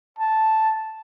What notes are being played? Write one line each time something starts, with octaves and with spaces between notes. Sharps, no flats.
A5